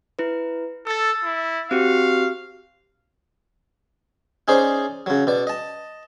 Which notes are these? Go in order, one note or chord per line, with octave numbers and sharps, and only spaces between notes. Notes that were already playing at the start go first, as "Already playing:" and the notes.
E4 B4
A4 E6 A6
E4
C4 F#4 G4 F5
C#4 D#4 G#4 C5 D5
C#3 F#3
B2 D5
D#5 A5